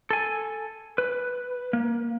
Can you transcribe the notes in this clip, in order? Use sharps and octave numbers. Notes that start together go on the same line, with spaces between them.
A4 G#5
B4
A#3